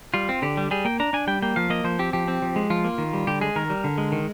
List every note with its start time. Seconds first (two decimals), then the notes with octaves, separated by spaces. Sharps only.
0.14 G3 F4
0.29 C4
0.42 D3 G4
0.57 G3
0.71 G3 G#4
0.85 A#3 G5
1.00 D4 A#5
1.13 D4 G#5
1.27 G3 G5
1.42 A#3 G5
1.56 F3 F5
1.70 A#3 D#5
1.84 F3 C5
1.99 C4 G4
2.13 F3 G4
2.28 C4
2.42 F3
2.56 G#3
2.70 F3 F4
2.84 A#3
2.98 D#3
3.13 G3
3.27 D3 G4
3.41 G#3 G#4
3.56 D#3 A#4
3.70 G3
3.84 D3
3.98 G#3
4.12 D#3